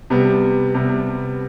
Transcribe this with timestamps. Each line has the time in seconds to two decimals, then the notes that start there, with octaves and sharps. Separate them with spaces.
0.10 C3 G3 B3
0.75 C3 G3 B3